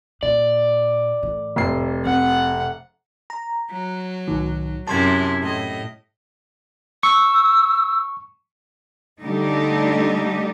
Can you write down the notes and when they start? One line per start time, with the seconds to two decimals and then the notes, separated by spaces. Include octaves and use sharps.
0.23 A#2 D5
1.23 A2 E3
1.56 F1 C7
2.05 C4 F#5
3.30 A#5
3.72 F#3
4.28 C2 A2 D#3
4.87 F#2 C3 E4 A5 C6 G#6
5.42 A2 D#5
7.03 C#6 E6
9.21 D3 G3 A3 D#4 G4